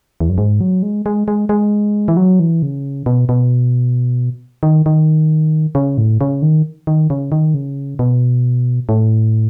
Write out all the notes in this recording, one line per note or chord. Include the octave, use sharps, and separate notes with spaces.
E2
F#2
G#2
F#3
G#3
G#3
G#3
G#3
E3
F#3
E3
C#3
B2
B2
D#3
D#3
C#3
A2
C#3
D#3
D#3
C#3
D#3
C#3
B2
A2